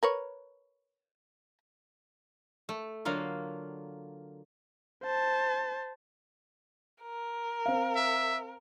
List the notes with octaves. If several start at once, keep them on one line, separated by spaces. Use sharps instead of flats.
A#4 B4 C#5
A3
D3 F#3 A#3 F4
C5 A5
A#4
C4 F5
E5